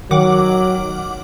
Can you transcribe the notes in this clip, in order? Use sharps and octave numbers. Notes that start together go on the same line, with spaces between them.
D#3 F#3 F#5 D6